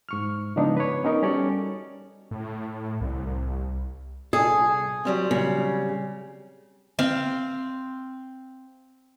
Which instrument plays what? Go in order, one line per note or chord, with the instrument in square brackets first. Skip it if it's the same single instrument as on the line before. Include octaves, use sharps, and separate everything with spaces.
[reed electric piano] G#2 C#6 F6
C#3 F3 G#3 B3 D4 D#4
B4 C#5
B3 C#4 D#4 A#4
G3 C#4 F#4 A4 C#5 D5
[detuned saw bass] A2
C2
[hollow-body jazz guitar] C2 A4 [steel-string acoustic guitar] G#4
[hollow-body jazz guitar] F#3 G3 C4
[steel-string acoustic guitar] C#3
[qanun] C4 F5